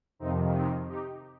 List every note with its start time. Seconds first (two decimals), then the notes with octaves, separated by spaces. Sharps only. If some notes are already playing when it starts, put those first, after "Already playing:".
0.19 F2 C3 D#3 C4 D#4
0.53 C4 D#4
0.88 D#4 G4